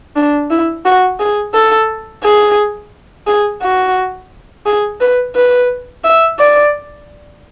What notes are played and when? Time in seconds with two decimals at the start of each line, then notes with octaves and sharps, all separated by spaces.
0.16 D4
0.50 E4
0.85 F#4
1.20 G#4
1.54 A4
2.23 G#4
3.27 G#4
3.62 F#4
4.66 G#4
5.00 B4
5.35 B4
6.04 E5
6.39 D5